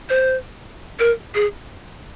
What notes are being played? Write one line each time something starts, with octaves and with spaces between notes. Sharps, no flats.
C5
A#4
G#4